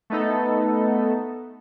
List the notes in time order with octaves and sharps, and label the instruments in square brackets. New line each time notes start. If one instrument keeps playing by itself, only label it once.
[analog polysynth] A3 B3 D#4 A4